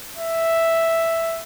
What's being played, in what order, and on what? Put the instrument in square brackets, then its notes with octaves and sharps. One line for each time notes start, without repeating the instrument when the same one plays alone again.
[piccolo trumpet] E5